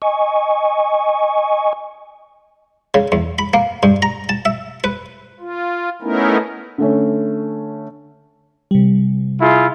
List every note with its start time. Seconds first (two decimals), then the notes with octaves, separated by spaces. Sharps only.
0.02 D#5 G#5 C#6
2.94 C#3
3.12 E2
3.39 B5
3.54 A#3
3.83 G2
4.02 A#5
4.29 A5
4.45 E5
4.84 B4
5.40 F4
6.02 A3 B3 C#4 D#4 E4 A#4
6.78 D3 A3 C#4
8.71 C3 G3
9.40 E4 F4 G#4